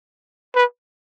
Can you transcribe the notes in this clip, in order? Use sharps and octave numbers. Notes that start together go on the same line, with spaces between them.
B4